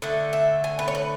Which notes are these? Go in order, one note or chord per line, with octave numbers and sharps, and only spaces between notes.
D3 A3
E5
G#5
B4
C#5
B4